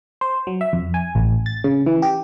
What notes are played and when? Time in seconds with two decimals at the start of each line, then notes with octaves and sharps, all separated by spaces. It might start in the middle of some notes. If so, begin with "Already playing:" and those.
0.21 C5
0.47 F#3
0.61 E5
0.73 F2
0.94 G#5
1.15 A1
1.46 A6
1.64 C#3
1.86 E3
2.02 G4